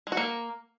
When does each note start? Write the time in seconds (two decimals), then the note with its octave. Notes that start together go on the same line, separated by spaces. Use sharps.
0.07 G#3
0.12 F#4
0.17 A#3